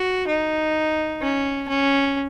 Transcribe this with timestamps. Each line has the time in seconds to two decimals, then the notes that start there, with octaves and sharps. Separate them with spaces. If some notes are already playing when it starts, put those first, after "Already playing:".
Already playing: F#4
0.28 D#4
1.21 C#4
1.68 C#4